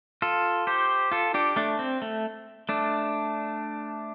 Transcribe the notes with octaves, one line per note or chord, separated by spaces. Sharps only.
F4 A4
G4 C5
F4 A4
D4 G4
A3 D4
C4
A3
A3 D4